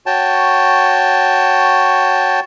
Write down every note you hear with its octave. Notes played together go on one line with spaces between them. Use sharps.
F#4 C#5 G5 A5